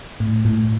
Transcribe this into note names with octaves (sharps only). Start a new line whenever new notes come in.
A2
A2